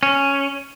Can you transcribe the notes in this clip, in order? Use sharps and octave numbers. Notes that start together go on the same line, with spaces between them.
C#4